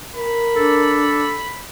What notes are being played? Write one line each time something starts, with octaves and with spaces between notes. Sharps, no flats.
A#4 B5
D4 A4